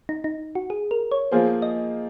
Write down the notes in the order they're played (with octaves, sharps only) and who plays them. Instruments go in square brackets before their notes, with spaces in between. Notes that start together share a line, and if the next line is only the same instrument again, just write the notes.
[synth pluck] D#4
D#4
F#4
G#4
A#4
C#5
[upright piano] F3 A#3 F4 G#4 C5
[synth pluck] D#5